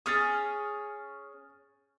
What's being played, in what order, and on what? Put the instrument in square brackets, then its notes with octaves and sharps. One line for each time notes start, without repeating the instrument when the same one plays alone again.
[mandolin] C#4 G#4 C#5 [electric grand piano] D#6 F6 A6